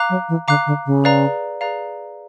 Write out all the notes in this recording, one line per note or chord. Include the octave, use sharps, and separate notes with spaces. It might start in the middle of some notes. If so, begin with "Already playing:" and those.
Already playing: F5 A#5 D6 F#6
F#3
E3
D3 F5 A#5 D6 F#6
D3
C#3
G#4 B4 D5 F5 A#5
G#4 B4 D5 F5 A#5